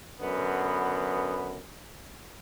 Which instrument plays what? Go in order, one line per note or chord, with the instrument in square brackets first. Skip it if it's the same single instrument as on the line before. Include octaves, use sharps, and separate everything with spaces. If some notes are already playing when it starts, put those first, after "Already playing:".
[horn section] F#2 D3 B3